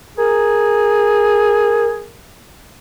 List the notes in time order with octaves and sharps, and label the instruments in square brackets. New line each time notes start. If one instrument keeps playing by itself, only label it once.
[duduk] G#4 [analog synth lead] A#4